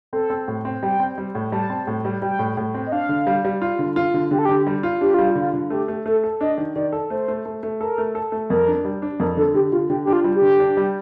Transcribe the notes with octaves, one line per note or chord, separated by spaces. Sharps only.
C4 A4
C4
A2
C4
G3 G5
C4
G3
A2
G3 A5
C4
A2
G3
G3 G5
A2
A2
C4
D#5
D4 F5
D3
G3
G3
F4
D3
F4
D3
D3 G4
A4
D3 G4
G3
F4
D4 G4
G3 F4
D3 F4
D3
A3 G4
A3
A3 A4
A4
D4 D#5
D#3
D#3 D5
A4
A3 C5
A3
A3
A3
A4 A#4
A3
A4
A3
F2 A#4
D4
G3
D4
F2 A#4
D3 A4
D3 G4
D3 F4
D3 G4
D4 G4
F4
G3
G4
D3
D4
G3